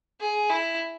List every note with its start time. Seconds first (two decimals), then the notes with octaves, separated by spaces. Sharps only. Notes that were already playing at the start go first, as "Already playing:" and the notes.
0.21 G#4
0.50 E4